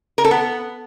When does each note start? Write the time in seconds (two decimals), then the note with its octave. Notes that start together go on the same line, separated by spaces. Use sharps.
0.18 A#4
0.25 A4
0.31 B3